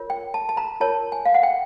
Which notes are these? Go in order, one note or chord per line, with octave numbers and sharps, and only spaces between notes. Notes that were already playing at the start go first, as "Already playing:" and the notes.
Already playing: F4 A#4 C#5
G5
A5
A5
A#5
F4 A#4 C#5 A5
G#5
F5
F#5
G5